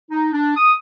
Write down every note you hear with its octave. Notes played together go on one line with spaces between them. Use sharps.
D#4
D4
D#6